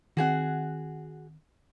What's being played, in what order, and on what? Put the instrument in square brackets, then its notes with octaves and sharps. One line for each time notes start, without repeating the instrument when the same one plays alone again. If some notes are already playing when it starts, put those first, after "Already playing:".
[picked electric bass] D#3 C4 [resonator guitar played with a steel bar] F#4 G#4 F#5